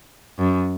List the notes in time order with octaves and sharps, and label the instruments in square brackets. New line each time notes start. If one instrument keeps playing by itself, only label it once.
[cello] F#2